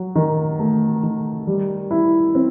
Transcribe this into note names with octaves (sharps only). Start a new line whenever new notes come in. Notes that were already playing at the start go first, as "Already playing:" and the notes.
Already playing: F#3
D#3
A3
D#3
G3
E4
C4